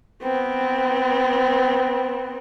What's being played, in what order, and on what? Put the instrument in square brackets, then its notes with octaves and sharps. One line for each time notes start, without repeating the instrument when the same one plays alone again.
[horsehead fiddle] B3 C4